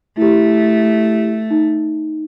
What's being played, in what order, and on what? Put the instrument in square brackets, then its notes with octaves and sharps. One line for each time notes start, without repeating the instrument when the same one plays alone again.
[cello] A3 [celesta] E4 G4
[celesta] D#4